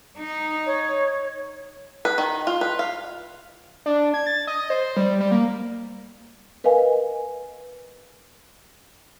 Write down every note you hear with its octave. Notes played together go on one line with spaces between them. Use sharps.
D#4
C#5
B4
D#3
F4
B4
F5
D4
G#6
A6
D#5
C5
G3
G3
A#3
A#4 B4 D#5 F5 G#5